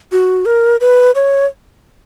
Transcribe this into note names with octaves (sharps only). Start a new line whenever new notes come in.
F#4
A#4
B4
C#5